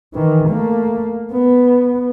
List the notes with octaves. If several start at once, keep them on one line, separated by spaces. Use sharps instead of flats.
D#3 E3
A3 A#3
B3